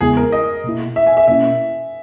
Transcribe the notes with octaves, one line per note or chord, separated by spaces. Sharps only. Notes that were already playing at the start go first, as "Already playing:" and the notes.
E2 C#3 G#3 B3 E4 G#4
A#4
D#5
B2 A#3 E4
E5
G#5
E5
B2 A#3 C#4 E4 E5